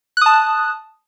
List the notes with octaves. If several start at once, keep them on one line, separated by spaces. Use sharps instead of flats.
A5 D#6 F#6